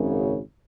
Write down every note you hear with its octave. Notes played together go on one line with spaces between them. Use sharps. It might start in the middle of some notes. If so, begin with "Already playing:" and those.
Already playing: G#1 F#2 C#3